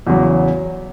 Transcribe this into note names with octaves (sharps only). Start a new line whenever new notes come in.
E2 C#3 F#3